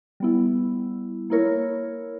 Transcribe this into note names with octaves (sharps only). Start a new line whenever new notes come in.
G3 B3 E4
A#3 E4 A#4 C#5